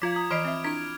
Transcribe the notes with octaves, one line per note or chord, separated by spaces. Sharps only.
F3 F4 F5 D6 G#6 B6
A#5 D#6
E3 D5 D#5 B5 F6 D7 F7
C4 E5
D4 E4 G#6